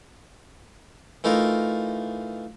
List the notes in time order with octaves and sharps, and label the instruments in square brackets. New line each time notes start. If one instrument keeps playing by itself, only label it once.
[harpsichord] E3 A3 D#4 F4 A#4